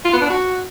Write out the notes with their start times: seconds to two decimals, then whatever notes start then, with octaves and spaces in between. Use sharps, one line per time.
0.05 F4
0.13 B3
0.21 D4
0.30 F#4